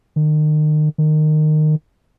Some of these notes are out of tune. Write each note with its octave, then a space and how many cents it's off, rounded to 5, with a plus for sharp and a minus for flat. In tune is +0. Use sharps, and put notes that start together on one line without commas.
D#3 -35
D#3 -20